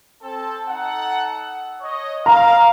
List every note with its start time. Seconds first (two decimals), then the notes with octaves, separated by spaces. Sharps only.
0.21 C4 A4
0.67 D#4 A4 F#5
1.81 C#5 D#5
2.26 F5 A#5